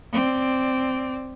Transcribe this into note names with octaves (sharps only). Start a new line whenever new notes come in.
C4 D5